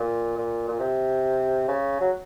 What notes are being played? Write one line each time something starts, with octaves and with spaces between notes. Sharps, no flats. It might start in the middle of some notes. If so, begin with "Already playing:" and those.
Already playing: A#2
A#2
A#2
C3
C#3
F#3